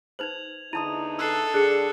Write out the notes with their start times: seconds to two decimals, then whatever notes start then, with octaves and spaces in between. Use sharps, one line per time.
0.19 D#4 B4 C5 G#6 F7 F#7
0.73 E2 D3 D#4 E4 A5 C6 D#6 D#7
1.19 A4 E6 F#6 C7
1.54 G2 D4 G#4 F#6 C#7